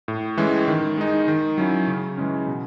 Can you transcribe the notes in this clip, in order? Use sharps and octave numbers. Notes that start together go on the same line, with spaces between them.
A2
E3 G#3 C#4 E4
D#3
G#3 D#4
D#3
F#3 C#4 E4
C#3
E3 G#3 C#4
B2